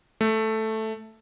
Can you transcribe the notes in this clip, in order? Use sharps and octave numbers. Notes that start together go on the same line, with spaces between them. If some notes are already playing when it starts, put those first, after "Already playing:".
A3